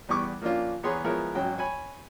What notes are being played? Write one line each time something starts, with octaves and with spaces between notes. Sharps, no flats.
E2 G3 B3 C#6 D6
F3 A#3 C#4 D4 F4
E2 B3 G#4 C#5 A#5 C6
F3 G#3 B3 E4 A#4 C#5
G#1 F#3 C#4 G5
C#5 G#5 B5